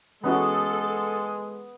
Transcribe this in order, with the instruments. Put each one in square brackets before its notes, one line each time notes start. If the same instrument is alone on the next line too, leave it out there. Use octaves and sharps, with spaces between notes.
[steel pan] E3 C#4 F#4 [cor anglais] G#3 [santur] B3 [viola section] A4